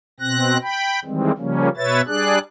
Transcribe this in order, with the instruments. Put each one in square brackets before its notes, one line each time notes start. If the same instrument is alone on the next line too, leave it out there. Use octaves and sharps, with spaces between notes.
[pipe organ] B2 C4 F#6 A#6
G5 B5
D#3 E3 G3 G#3 C4
C#3 F3 G3 A#3 C#4
B2 B4 C#5 E5 A6
G3 D4 G#4 D5 F#6